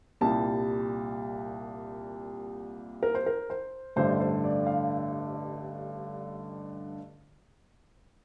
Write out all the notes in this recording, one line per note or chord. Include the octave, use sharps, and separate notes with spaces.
C2 A#2 G3 A5
A#4
C5
A#4
C5
A1 G2 D3 A3 C5
C5
D5
F5